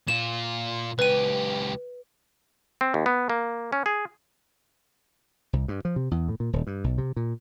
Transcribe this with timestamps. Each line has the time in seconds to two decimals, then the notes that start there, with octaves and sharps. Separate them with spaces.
0.08 A#2 F4 E7
0.99 C#2 G4 B4 D#7
2.81 C4
2.94 D#2
3.06 B3
3.30 A#3
3.73 C#4
3.86 G#4
5.53 C2
5.68 G2
5.85 F3
5.96 C3
6.11 E2
6.29 A2
6.40 A#2
6.53 D#1
6.67 G2
6.84 B1
6.98 C3
7.16 A#2